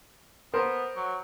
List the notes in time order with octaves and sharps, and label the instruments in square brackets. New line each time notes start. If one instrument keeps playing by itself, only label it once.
[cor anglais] B3 [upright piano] A#4 C5
[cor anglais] F#3